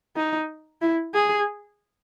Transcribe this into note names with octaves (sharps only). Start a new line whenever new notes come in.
D#4
E4
G#4